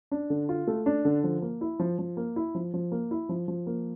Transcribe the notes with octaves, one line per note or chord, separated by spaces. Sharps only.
D4
D3
F4
A3
D4
D3
F3
A#3
E4
F3
F3
A#3
E4
F3
F3
A#3
E4
F3
F3
A#3